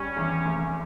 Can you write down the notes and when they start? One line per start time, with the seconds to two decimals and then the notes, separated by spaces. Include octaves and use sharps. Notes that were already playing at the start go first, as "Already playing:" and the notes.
Already playing: G3 C#4
0.16 E2
0.45 F1